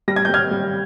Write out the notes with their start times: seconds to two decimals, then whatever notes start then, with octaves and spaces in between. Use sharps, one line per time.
0.08 G3 A#6
0.16 G#6
0.25 G6
0.29 G3 F6 G#6
0.51 G3